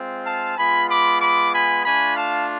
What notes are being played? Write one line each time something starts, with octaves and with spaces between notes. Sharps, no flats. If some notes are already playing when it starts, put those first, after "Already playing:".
Already playing: G#3 C4 F4
F5 A5
G#3 B3 F4 G#5 B5
B5 D6
B5 D6
G#5 B5
A3 D4 F4 G#5 B5
F5 A5